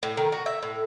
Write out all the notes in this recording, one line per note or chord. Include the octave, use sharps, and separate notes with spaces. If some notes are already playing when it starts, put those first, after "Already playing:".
A2
D#3
F#4
E5
A2